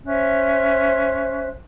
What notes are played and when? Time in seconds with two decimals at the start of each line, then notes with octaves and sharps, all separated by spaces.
0.06 C#4 C5 E5 F#6